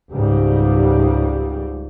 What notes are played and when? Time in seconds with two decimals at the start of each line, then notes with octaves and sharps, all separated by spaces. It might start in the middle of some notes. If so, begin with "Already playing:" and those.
0.12 C#2 G#2 G3